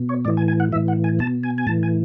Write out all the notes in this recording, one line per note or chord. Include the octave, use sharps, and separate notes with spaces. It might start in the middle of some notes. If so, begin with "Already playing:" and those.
Already playing: B2
C#5
A2 E3 D5
G#5
G#5
F#5
A2 E3 E5
F#5
G#5
B2 A5
G#5
G#5
A2 E3 A5
G#5